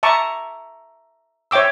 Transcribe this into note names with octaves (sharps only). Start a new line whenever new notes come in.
E5 A5 A#5 C#6 D6
C#5 E5 G5 D6 E6